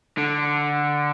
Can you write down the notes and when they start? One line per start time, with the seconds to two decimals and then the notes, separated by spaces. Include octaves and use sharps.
0.18 D3